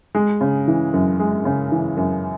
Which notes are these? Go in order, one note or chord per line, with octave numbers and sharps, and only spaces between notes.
G#3
C#3
E3
F#2
G#3
C#3
E3
F#2